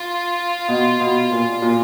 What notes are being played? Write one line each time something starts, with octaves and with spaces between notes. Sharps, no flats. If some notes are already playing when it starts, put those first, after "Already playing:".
Already playing: F4
B2
B2
A#2
A#2